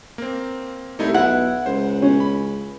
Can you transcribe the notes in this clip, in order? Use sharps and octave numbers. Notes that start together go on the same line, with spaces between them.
A#3 C4
C2 A3 D#4 E4
B1 E4 F#5
C#2 C5
C#4
B5